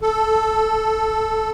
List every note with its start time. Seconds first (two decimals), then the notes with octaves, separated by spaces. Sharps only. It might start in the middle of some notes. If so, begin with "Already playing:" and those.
0.01 A4